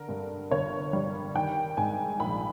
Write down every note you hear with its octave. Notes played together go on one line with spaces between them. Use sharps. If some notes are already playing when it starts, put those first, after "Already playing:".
Already playing: D3 A#4
G2
G1 C#5
G3
D#3 G5
G#2 G#5
A#1 B5